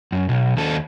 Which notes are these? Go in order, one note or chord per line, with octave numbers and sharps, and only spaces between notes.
F#2
B1
D#2 A4